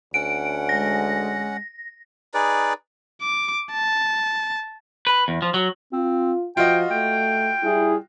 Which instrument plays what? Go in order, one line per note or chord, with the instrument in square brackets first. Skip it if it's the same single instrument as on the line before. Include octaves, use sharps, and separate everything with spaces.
[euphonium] D2 [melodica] C#4 F#5 [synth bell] D7
[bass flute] G#3 [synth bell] A#6
[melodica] D#4 G#4 B4 D5
[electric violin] D6
A5
[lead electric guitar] B4
E2
F3
F#3
[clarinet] C4 [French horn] F4
[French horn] F3 [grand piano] F4 F#4 D#5 [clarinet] G5
[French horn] A3 [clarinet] G5
[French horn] G3 [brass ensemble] E4 G#4